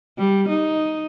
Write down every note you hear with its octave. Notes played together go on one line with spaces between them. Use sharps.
G3
D#4